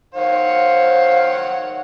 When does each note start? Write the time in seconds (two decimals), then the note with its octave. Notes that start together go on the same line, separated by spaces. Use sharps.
0.14 D#3 C5 C#5 F5 F#5